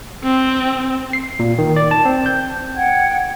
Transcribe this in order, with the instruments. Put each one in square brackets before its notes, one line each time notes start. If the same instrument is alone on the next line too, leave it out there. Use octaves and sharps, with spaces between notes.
[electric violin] C4
[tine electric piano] C7
A#2
D#3
D5
A5
C4
G6
[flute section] F#5 G5 G#6